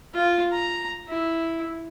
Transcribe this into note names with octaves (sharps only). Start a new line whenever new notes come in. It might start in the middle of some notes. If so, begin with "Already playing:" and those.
F4
A#5
E4